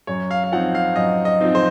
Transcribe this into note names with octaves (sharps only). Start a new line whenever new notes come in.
F#2 C#5
F5
F5
F3 C4 D#4 F#5
F5
F#2 D#5
D#5
F3 C4 D#4
C5